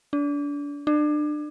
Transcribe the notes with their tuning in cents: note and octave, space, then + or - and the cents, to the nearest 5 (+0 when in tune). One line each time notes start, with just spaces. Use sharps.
D4 -30
D4 +30